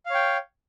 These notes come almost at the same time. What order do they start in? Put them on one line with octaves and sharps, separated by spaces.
F5 C#5 G5